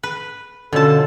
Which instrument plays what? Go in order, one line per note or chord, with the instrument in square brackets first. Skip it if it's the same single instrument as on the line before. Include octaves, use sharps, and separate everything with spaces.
[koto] B4
[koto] B2 A5 [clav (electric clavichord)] D3 C#4 F4 [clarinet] A4